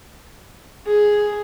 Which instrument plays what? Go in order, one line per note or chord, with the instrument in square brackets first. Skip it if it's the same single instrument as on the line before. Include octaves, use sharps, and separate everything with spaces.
[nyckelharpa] G#4